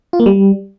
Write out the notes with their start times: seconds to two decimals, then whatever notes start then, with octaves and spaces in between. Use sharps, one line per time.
0.13 F4
0.20 A#3
0.26 G3